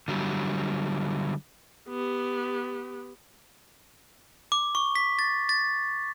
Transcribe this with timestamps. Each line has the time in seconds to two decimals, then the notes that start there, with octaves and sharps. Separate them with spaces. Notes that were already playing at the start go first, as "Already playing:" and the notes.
0.08 D3 F#3 G3
1.89 B3 G4
4.52 D6
4.75 C#6
4.95 B6
5.19 A6
5.49 A6